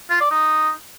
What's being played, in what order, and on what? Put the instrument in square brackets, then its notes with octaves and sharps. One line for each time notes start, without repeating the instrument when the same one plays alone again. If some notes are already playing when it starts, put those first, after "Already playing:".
[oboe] F4
D5
D#4